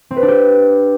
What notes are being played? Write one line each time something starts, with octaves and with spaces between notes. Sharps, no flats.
C4
B4
D4
G4